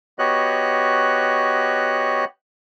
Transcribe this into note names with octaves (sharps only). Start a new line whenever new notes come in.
B3 F#4 G4 C#5 D#5 F#6